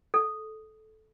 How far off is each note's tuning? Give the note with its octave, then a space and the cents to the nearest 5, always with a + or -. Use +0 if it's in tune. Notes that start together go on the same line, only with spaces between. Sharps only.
A4 -15